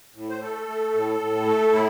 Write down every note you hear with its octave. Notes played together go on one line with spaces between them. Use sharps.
A2
C5
A3 A4
A3
A2
A2
A3
A2 E4